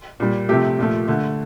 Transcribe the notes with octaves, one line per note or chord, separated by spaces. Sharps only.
A#2 G3
C3 F3 A3 G4
A#2 F3 A3
D3 A3